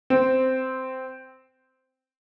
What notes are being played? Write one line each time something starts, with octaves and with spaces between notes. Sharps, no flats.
C4